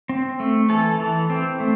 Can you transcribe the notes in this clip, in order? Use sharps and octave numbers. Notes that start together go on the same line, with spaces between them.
C4
A3
E3 A4
E3
C4
A3